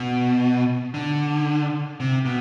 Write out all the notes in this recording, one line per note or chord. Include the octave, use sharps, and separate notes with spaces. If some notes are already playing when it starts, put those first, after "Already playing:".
Already playing: B2
D3
C3
B2